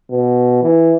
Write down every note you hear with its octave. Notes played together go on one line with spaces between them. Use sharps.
B2
E3